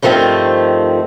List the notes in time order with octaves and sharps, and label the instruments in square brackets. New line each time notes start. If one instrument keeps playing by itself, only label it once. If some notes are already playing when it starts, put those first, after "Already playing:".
[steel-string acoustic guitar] G2 D#3 F3 A3 C4